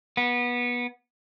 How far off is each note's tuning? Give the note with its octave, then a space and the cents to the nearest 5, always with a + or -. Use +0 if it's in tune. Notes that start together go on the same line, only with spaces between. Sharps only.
B3 -20